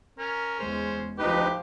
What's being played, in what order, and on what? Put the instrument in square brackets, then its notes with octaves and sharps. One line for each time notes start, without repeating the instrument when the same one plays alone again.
[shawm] C#4 [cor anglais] A#4
[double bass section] E2 G#3 [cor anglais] C5
[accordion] D2 D#4 B4 [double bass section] F3 [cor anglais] G4